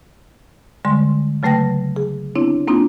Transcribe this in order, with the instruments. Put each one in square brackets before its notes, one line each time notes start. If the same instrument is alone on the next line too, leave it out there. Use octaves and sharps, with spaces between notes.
[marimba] D3 G3 G#3 C6
C#3 F#3 A3 B4 G5 A#6
G#4
B3 C4 D4 E4 C#5
A#3 C4 D4 D#4 F4